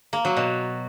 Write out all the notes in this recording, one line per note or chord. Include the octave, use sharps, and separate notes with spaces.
A#3
F#3
B2